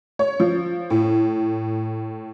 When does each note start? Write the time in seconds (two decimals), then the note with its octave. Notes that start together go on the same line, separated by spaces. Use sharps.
0.19 C#5
0.40 F3
0.90 A2